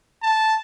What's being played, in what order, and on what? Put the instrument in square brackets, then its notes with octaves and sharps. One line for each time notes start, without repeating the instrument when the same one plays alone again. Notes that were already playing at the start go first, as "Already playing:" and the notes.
[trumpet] A5